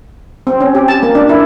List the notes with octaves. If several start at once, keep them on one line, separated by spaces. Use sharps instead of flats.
C4
C#4
G4
A5
A#3
D4
E4